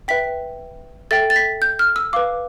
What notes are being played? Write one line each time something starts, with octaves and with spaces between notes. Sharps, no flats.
B4 E5 G5 B6
A4 E5 G5 A6
A6
B6
G6
F6
E6
B4 F5 D6